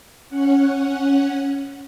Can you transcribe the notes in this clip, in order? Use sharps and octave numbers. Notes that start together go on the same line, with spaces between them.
C#4 F#5